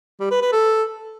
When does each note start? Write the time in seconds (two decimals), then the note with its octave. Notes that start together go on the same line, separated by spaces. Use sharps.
0.20 G3
0.31 B4
0.42 B4
0.52 A4